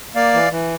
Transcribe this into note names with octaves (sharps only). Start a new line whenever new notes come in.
A#3 D5 F5
E3
E3